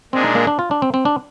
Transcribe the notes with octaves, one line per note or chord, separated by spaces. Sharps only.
A#2 G#3 C4 D4 G#4
D#4
A#3
D4
F4
D4
C4
C4
D4